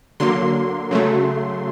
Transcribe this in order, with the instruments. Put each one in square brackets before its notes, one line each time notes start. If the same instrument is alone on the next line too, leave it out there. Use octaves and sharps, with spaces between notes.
[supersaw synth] D3 F#3 A#3 C6
C#3 F#3 A3